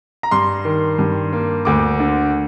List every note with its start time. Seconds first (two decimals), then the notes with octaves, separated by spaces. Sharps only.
0.23 A#5
0.31 G2 C6
0.65 D#3
0.99 G2
1.33 A#3
1.65 D2 D6
2.00 D3